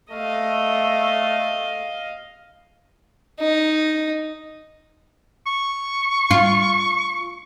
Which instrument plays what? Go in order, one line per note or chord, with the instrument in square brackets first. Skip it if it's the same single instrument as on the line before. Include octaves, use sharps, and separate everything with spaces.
[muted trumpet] A3 [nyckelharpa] D#5 F5
[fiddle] D#4
[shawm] C#6
[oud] F4